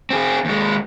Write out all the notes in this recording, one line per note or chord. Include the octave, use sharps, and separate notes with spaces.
C4 G#4
D#2 G#3